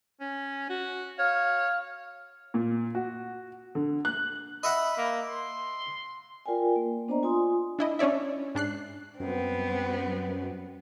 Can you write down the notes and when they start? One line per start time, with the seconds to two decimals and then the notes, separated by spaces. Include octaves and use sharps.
0.21 C#4
0.70 F#4
1.19 C#5 F5
2.54 A#2
2.95 F#4
3.75 D3
4.05 F#6
4.63 D#5 E5 F#5 B5
4.97 A#3
5.30 C6
6.46 F4 A#4 D5 G5 G#5
6.76 A#3
7.08 B3 D4 C5 D5 D#5 A#5
7.23 F4 G#5 C6 D#6
7.79 D4 E4 D#5
7.99 C#4 D4 C#5 D5 E5
8.55 G#2 D4 F#6 C7
9.20 F#2 G3 B3 C4